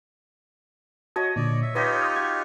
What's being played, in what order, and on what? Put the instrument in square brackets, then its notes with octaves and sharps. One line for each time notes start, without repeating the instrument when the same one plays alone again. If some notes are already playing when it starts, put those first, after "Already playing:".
[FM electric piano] F#4 A5 D#6 [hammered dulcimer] C#5 D#5
[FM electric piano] A#2 D3 [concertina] D5
[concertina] E5
[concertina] D#4 F4 G4 [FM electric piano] B4 [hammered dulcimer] C#5 D#5 B5
[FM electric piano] C6 D#6 F6
[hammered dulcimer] F#4 [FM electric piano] G#6